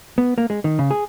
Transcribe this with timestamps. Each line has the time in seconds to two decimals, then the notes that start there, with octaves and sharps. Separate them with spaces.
0.18 B3
0.38 A#3
0.50 G#3
0.64 D#3
0.79 C#3
0.91 G#4